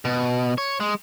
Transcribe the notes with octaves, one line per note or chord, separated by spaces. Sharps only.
B2
C#5
G#3